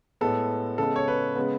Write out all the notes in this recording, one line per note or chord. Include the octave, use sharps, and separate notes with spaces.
A2 G#3 B3 A4
C#3 G#3 B3 A4
C#5
B4
C#3 G#3 B3